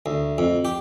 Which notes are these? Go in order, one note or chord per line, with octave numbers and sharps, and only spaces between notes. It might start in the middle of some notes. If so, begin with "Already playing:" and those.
D2
F2
G4